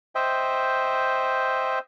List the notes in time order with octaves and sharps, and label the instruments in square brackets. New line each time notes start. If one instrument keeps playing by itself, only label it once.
[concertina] C5 D#5 E5 G5